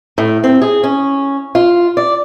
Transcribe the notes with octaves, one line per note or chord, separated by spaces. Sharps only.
A2
C4
G#4
C#4
F4
D5